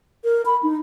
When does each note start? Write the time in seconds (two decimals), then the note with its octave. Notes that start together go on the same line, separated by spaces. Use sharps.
0.24 A#4
0.46 B5
0.63 D#4